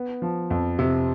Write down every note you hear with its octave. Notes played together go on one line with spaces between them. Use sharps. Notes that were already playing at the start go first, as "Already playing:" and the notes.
Already playing: B3
F3
F2
C3